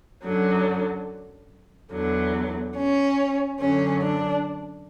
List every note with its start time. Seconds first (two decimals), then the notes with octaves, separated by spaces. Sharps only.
0.23 F#2 D3 F#3
1.92 E2 D3 F#3
2.76 C#4
3.60 F#2 D3 F#3 C#4
4.02 D4